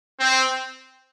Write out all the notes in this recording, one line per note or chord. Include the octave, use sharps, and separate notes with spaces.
C4